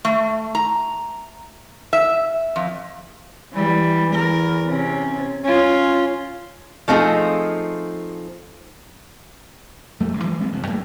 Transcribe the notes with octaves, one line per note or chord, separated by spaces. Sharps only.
A3
A#5
E5
F2
E3 G3
E2 A#4
C3 C#4
C#4 F4
F3 A3 C4 D#4 G#4
F2 G3 A3 A#3
G1 D2 C#3
E3 F3 G3 G#3
G3 G#3 B3 C4
F1 F#2
F#2 A3 A#3